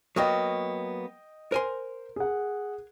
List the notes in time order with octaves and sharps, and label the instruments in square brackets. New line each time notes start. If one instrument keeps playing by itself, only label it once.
[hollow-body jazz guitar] F#3 A#3 B3 [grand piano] D#5 G5 D#6
[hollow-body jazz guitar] A#4 G#5 C6 [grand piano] C5
[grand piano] G#4 F#5